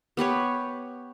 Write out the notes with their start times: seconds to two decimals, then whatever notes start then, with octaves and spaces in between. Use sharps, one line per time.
0.17 B3 G4 B4 C#5